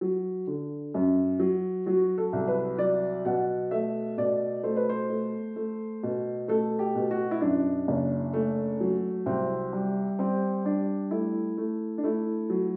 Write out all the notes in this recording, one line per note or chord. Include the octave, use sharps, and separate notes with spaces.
F#3
D3
F#2
F#3
F#3 F#4
A4
C2
B4
F#3 D5
B2 F#5
A3 E5
B2 D5
A3 C5
B4
C5
A3
A3
B2
A3 A4
G4
B2
F#4
E4
F#2 D4
F#1
A3
F#3
C2 C4
G3
G3 C4
G3 D4
A3 E4
A3
D4
A3 E4
F#3